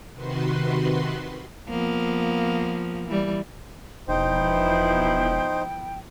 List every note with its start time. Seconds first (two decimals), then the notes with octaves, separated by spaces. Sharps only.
0.13 C3 D#3 F#4 B4 C6
1.68 F3 A#3 B3
3.08 E3 G3
4.08 E1 F3 B3 D#4 E4 C5 G5